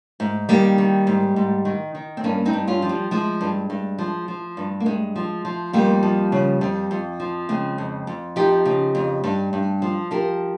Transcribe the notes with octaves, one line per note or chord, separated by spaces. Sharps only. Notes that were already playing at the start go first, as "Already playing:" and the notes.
G#2
D#3 G3 A#3
D#3
G#2
G#2
D#3
D#3
C4
G2 A#3 C#4
C4 D#4
G2
C#4 F4
F3
G3
F3 G#3
G2
G2
F3
F3
G2
A#3
G2 G#3
F3
F3
F2 G3 A#3
F3
C#3
F2
F2
F3
C#3 G#3 C4
F2
F2
F3 D#4 G4
C#3
F2
G2
G2
F3
F3 G4 A#4